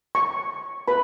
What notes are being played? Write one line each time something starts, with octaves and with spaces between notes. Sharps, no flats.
C#6
B4 B5